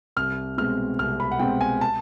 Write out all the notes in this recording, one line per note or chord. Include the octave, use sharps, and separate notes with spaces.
C2 F6
B2 G#3 C4 F6
C2 F6
B5
F#5
B2 G#3 C4 G5
G#5
A5